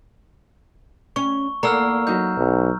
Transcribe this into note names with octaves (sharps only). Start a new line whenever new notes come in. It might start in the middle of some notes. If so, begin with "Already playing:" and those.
C#4 C#6
E2 A#3 A4 D5 F#5 A#5 E6 F6
F#3 D#4 G6
B1